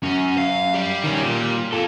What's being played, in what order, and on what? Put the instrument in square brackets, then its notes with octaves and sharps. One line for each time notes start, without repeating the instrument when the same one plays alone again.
[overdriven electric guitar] F#2 [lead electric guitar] C#4
[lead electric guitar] F5
G4 D5
[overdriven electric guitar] D#3 C#4
A#2
F4 A4